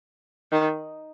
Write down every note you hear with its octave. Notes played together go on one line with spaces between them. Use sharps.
D#3